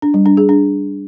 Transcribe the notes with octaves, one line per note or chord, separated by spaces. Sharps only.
D4
G3
D4
G#4
D4